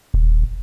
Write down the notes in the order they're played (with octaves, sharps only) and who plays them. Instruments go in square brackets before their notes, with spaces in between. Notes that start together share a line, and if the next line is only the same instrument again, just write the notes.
[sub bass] D#1